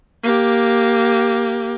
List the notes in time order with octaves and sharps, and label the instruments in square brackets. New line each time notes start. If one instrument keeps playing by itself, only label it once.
[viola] A#3 G4